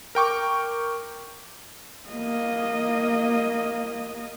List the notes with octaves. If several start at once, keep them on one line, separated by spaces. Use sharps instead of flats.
A#4 G5 C#6 D6
A#3 D#5